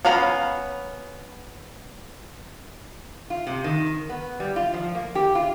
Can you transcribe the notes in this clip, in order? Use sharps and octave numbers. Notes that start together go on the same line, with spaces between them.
B3 C#4 F5 A#5 B5
F4
C3
D#3
B3
G3
F4
F3
A#3
G4
F4